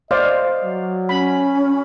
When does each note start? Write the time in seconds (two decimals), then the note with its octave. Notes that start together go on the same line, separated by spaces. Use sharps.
0.11 C5 D5 D#5 F5
0.64 F#3
1.09 C#4 B5